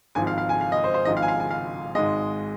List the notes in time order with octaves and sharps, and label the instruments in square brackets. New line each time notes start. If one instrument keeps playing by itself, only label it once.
[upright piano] G#1 G#2 F3 G#5
F5
F5
G#5
F5
D#5
C5
C5
G#1 G#2 F3 D#5
F5
G#5
F5
G#5
F5
G#1 G#2 G#3 D#5